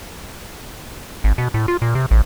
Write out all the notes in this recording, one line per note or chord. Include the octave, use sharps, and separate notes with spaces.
G#1
B2
A2
F4
A#2
C3
A1